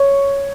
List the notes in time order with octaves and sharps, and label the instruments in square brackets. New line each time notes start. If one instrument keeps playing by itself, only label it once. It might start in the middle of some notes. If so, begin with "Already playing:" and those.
Already playing: [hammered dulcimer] C#5